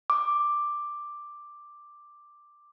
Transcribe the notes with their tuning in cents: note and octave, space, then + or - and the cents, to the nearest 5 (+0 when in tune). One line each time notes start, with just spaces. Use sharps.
D6 +5